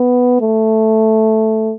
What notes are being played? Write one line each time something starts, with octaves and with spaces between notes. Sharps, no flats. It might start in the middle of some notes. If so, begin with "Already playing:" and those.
Already playing: B3
A3